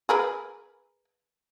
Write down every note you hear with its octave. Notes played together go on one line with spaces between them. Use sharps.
G#4 A#4 B4